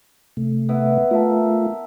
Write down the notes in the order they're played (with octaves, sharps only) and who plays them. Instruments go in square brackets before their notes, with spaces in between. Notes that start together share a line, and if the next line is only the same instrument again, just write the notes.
[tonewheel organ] C3 A3
[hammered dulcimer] B3 E4
[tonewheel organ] A3 F4 [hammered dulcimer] A#4 E5 A5